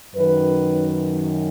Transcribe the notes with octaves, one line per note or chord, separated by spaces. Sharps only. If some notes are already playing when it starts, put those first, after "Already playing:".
F#2 D#3 B4